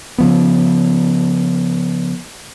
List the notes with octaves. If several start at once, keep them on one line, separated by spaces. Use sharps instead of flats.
C#3 F3 B3